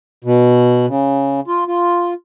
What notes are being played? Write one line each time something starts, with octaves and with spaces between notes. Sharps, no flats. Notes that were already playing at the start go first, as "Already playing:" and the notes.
B2
C#3
F4
F4